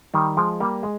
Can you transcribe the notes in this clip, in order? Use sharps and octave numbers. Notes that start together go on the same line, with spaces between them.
D#3 G3
F3 G#3
G3 A#3
G#3